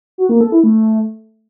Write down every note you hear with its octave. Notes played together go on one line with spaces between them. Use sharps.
F#4
A#3
A4
E4
A3